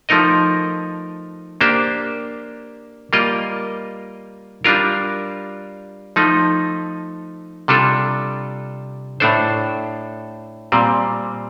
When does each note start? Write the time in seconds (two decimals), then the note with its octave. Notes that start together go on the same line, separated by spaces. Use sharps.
0.09 F3 A3 D#4 A#4 D#5
1.61 A#3 D4 G4 C5
3.13 G3 A#3 F4 A#4 D#5
4.64 G3 D4 F4 A#4
6.16 F3 A3 D#4
7.68 C3 G3 D4 F4 A4
9.20 A2 A3 D4 A4 C5
10.72 A#2 G3 C4